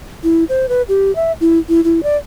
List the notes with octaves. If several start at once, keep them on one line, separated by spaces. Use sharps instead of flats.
E4
C5
B4
G4
E5
E4
E4
E4
D5